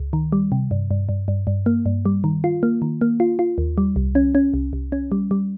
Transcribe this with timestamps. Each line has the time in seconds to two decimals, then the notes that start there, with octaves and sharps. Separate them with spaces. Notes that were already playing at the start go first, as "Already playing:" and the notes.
Already playing: C#2
0.13 D#3
0.32 G3
0.52 C3
0.71 G2
0.91 G2
1.09 G2
1.28 G2
1.47 G2
1.66 A#3
1.86 G2
2.05 G3
2.24 D#3
2.44 F4
2.63 A#3
2.82 D#3
3.01 A#3
3.20 F4
3.39 F4
3.58 D#2
3.78 G3
3.96 C2
4.15 C#4
4.35 C#4
4.54 C2
4.73 C2
4.92 C#4
5.12 G3
5.31 G3